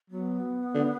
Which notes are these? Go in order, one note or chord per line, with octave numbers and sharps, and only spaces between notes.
F#3 B3
D3